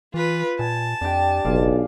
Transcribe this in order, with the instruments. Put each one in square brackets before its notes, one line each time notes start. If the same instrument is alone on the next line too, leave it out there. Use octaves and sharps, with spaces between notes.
[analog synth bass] E3 [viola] F4 B4
[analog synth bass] A#2 [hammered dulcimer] G#5 [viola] A5
[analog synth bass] F2 [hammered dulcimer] D4 G4 G5
[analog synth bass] F#1 [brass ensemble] B1 [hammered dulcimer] D5 F5 G#5